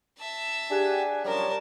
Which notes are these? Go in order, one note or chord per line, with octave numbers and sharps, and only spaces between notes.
E5 A5
D4 G4 G#4 F#5 G#5
F#2 C3 F3 G3 A#4 C#5 A5